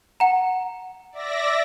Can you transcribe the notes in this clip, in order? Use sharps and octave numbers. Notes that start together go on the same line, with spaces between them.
F#5 A#5
D5 E5 A#6